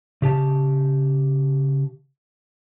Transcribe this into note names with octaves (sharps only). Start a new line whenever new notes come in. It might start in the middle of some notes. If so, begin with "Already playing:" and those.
C#3 G4 A5